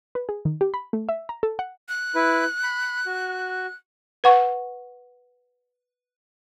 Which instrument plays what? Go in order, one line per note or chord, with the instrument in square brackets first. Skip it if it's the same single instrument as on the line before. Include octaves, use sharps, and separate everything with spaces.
[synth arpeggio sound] B4
G#4
D#3
G4
B5
A3
E5
A#5
A4
F#5
[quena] F#6
[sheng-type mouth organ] E4 B4
B5
F#4
[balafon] B4 F#5 C#6